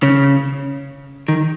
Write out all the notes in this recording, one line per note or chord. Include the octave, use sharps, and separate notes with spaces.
C#3
D#3